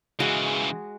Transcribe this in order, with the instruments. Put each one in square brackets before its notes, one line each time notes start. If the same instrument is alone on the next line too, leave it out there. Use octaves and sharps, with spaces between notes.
[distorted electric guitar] C#3 E3 [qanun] G#3 F#4 D#5